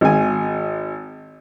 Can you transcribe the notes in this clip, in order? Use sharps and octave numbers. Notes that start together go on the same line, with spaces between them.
G#1 G#5